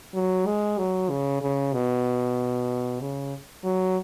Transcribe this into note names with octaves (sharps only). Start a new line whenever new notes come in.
F#3
G#3
F#3
C#3
C#3
B2
C#3
F#3